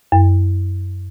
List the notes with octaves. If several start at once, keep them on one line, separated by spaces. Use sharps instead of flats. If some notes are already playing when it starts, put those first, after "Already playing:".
F#2